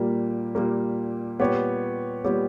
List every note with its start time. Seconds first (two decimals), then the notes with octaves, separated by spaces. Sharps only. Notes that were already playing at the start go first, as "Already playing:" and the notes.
Already playing: A#2 G3 A#3
0.55 A#2 G3 A#3
1.40 A#2 G3 B3 G4 C#5
2.24 A#2 G3 B3 G4 C#5